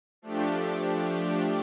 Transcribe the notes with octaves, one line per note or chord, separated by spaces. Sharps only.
F3 A3 D4 G4